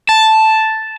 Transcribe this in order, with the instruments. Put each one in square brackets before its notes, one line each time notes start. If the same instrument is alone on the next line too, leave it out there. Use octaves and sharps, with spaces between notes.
[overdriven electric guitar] A5